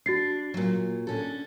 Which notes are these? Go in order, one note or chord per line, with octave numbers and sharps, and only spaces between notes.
D4 F#4 A6 C7
A#2 F#3
D3 C#4 A4